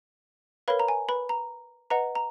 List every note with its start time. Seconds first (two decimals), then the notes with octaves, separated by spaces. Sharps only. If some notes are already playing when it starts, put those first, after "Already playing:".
0.68 A#4 B4 C#5 F5 B5
0.80 A#5
0.88 G#5
1.09 B4 B5
1.29 A#5
1.90 B4 D#5 F#5 A#5
2.15 A#5